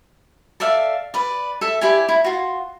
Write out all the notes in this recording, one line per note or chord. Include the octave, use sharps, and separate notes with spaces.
A4 D5 E5 F5
B4 D5
A4 E5
E4 G4 D5 G#5
E4
F4 F#4